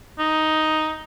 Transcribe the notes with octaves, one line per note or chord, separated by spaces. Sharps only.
D#4